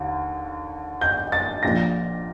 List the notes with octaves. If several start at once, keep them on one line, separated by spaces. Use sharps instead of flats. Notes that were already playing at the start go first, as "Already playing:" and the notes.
Already playing: D#2 D3
G6
A6
A#1 A#2 F3 A#6